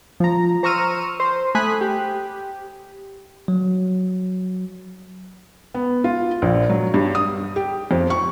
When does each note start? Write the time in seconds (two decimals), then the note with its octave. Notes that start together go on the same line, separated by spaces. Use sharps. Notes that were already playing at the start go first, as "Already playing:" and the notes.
0.20 F3 A#5
0.63 C5 A#5 C#6 E6 F6 D#7
1.20 C5
1.55 A3 G#5 B5 D#6 F#6
1.81 G4
3.48 F#3
5.74 B3
6.04 F4
6.42 A#1
6.69 F#3
6.94 G2
7.15 D#6
7.56 G4
7.91 F2
8.10 C#6